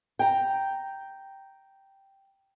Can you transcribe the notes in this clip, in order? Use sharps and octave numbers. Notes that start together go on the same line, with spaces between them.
G5 A#5